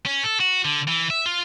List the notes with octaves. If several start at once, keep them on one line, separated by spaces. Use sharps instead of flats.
C#4
A4
F#4
D3
E3
E5
F4